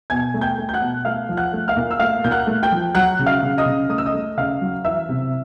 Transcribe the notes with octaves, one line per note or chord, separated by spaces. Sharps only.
B2 G#5 G#6
A3
G5 G6
A3
G6
F#5 F#6
B2
A3 F5 F6
F3
F#5 F#6
A3
F5 F6
A#2
E6
A3 F5 F6
A#2 G6
F#5 F#6
A3
G5 G6
F3
F#3 F#5 F#6
C#3
F5 F6
C#3
D#5 D#6
C#3
A3 D#6
E6
D#5 D#6
A3
C#3 F5 F6
F#3
E3 E5 E6
C3